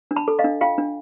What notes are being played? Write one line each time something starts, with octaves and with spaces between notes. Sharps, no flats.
D4
A5 B5
A4
D#5 F5
D4
F4 F5 G5
D4